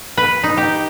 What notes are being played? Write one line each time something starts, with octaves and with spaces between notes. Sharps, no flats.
B4
D#4
G4